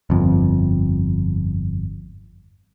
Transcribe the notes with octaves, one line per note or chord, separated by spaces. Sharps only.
G1 F2